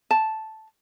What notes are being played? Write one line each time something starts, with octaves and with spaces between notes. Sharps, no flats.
A5